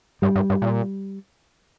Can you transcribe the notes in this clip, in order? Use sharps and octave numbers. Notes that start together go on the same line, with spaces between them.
G2 G3
G2
G2
A#2